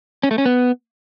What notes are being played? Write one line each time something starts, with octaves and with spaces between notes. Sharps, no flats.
C#4
A3
C#4
B3